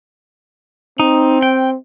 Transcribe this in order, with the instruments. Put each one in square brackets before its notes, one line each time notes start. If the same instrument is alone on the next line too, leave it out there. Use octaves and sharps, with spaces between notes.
[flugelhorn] C4 [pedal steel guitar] D#4
[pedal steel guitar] G5